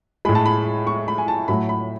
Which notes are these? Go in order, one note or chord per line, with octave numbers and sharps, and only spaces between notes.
A2 G#3 B5
A5
B5
C#6
B5
G#5
A5
A2 F#3 A3 B5
B5